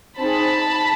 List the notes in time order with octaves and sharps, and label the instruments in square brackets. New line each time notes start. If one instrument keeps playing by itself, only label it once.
[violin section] C4 D#4 G#4 A5 B5